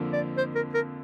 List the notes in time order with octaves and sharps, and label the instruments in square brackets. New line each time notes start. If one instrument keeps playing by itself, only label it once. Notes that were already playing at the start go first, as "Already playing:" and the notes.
Already playing: [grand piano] F2 D3 F3 A#3
[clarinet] D5
C5
A#4
A#4